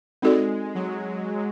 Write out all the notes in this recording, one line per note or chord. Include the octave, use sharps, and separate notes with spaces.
G#3 C4 D#4 F#4 A4 D5
F#3